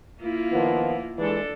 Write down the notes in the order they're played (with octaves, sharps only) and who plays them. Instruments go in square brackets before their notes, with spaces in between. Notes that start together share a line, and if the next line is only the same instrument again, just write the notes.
[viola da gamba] A#3 E4 F4
[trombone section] D#3 F3 B3
[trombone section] E3 G#3 [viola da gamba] D4 A4